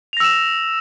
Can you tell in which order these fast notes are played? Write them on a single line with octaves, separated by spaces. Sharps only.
F7 A#6 E6 E7